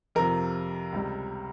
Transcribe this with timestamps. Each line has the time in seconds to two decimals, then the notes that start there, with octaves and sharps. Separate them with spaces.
0.15 F2 C3 F3 A#4
0.92 C#2 C3 G3